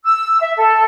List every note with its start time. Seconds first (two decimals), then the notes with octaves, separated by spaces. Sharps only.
0.05 E6
0.41 E5
0.57 A4